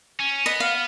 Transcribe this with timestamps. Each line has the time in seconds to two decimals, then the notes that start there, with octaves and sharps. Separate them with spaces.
0.20 C#4
0.46 B3 D#5
0.60 F5